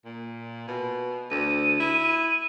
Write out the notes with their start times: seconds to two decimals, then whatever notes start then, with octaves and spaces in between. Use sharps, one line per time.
0.05 A#2
0.68 B2
1.31 D2 D#7
1.80 E4